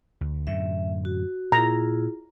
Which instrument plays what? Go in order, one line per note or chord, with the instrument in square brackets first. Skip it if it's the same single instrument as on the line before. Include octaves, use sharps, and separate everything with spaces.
[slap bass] D2
[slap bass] F#2 A2 D3 [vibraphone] E5
[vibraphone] F#4
[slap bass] A#2 [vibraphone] E4 F4 G#4 [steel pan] A#5